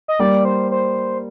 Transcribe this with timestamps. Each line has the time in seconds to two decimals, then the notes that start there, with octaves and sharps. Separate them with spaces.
0.08 D#5
0.19 G3 A#3 D5
0.45 C5
0.71 C5